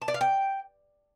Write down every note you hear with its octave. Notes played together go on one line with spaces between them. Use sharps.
A5
D5
F5
G5